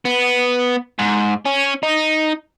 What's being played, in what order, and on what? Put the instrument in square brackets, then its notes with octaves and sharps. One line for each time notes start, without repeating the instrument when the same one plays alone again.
[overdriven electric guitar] B3
G#2
C#4
D#4